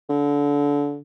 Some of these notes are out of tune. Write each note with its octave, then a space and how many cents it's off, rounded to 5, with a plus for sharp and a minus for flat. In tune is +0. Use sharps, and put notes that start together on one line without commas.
D3 -25